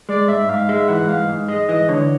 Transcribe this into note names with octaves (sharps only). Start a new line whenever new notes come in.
G#3 D5
G#2 E5
G#2 F5
G#3 E5
E3 F#5
G#2 F5
G#2
G#3 D#5
E3 D#5
D3 C#5